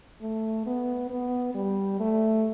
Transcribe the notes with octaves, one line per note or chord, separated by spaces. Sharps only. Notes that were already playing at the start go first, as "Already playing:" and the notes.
A3
B3
B3
G3
A3